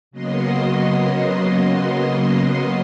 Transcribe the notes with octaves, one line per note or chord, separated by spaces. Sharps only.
C#3 F#3 A#3 B3 D#5 C6